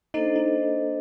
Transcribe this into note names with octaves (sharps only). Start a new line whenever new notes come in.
A#3 D4 D#4 A4 C5 D#5
D#4